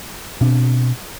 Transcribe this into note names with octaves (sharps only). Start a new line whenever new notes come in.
B2 C4 D4